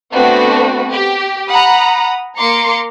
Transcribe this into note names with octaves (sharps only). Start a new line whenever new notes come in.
A3 B3 C4 D4 F#4 B4
G4
F#5 A#5 B5 D#6
A#3 A#5 C6 D6 C#7